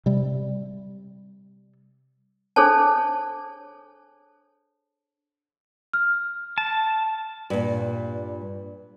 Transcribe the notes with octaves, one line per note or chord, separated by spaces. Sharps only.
C3 G3
D4 G#4 A4 C5 C#5 A5
F6
A5
G2 A#2